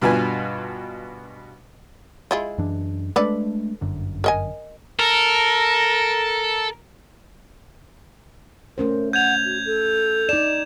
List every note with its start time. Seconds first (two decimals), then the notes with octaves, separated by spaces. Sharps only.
0.02 G2 B2 F4 B4 G#5
2.31 G#3 E4 F4
2.58 F#2 E3 D4
3.16 G#3 A3 D4 A4 B4 D5
3.81 G1 F#2 D3
4.24 A#4 D#5 G#5
4.99 A4 A#4
8.78 A3 C#4 A#4 C5
9.13 F#5 G6 G#6 F7
9.45 F#4
9.66 A4
10.29 D#4 D5 E7